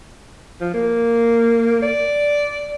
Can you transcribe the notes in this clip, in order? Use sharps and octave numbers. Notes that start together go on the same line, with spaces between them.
F3
A#3
D5